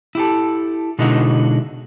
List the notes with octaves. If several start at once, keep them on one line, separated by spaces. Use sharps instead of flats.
E4 G4 A4
B2 D3 G#3 D#4 E4 F#4